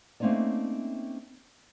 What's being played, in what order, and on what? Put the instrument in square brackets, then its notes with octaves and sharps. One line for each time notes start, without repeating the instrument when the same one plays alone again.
[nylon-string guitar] A3 A#3 C4 C#4 D#4 D5